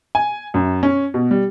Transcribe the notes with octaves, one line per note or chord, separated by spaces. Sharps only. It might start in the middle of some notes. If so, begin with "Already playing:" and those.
G#5
F#2
C#4
B2
G3